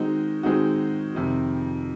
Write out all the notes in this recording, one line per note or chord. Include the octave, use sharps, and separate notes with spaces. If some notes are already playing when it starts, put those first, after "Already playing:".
Already playing: D#3 G#3 C4 D#4 F#4
D#3 G#3 C4 D#4 F#4
F2 C3 D#3